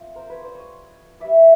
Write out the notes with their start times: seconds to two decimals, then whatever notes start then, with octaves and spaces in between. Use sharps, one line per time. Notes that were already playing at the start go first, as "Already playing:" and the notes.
Already playing: F3 A3 C4
0.16 A#4 C5
0.30 B4 C#5
0.42 C5 D5
0.55 C#5 D#5
1.20 G3 B3 E4 D5 E5